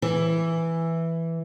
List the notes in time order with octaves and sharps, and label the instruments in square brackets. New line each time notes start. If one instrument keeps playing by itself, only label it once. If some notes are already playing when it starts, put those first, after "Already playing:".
[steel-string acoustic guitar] E3